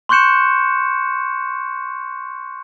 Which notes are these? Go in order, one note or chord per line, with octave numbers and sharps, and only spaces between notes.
C6 C#6 F#6 G6 C#7 E7